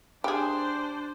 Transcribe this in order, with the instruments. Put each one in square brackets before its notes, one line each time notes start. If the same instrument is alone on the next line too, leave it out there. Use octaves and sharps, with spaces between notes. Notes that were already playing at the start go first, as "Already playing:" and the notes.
[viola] D4 C5 [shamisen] G4 G#4